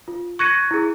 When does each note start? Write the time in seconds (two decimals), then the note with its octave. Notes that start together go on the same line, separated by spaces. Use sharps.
0.08 F4
0.39 C#6 F#6 G#6 A#6 C#7 D#7
0.71 E4 G#4